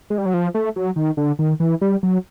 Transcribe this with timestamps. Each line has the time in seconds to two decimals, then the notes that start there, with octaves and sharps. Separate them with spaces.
0.10 G#3
0.18 G3
0.26 F#3
0.34 F3
0.54 A3
0.76 F#3
0.96 D#3
1.17 D3
1.39 D#3
1.60 E3
1.81 G3
2.03 F#3